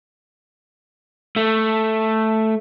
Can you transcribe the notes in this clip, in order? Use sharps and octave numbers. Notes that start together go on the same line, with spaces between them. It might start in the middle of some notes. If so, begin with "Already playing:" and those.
A3